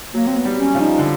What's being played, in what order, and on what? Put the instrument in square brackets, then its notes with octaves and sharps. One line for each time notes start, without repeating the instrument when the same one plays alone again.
[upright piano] F#3 [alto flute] A#3
[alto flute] C4
B3
[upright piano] G3
[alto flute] C#4
[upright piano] F3
[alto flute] D#4
[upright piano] D3